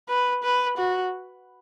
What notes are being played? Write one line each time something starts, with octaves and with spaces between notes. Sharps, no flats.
B4
B4
F#4